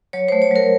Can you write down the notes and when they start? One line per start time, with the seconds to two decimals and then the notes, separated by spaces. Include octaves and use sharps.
0.13 F#3 C#5
0.28 A3 C5
0.42 C#5
0.51 F#3 A#4